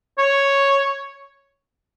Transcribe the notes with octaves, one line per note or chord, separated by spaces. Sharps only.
C#5